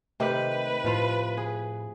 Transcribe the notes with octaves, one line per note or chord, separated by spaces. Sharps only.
C3 D#3 A3 G4 B4
A2 F3 F4 F5
G#4